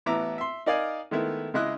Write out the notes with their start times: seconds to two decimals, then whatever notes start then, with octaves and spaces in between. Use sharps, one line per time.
0.06 A1 B3 E4 E5 A#5 D6
0.38 E5 C6
0.66 D#4 A#4 D5 D#5 F5 G#5
1.11 D#3 G#3 A3 B3 E4
1.54 C#3 G#3 E4 D#5 F#6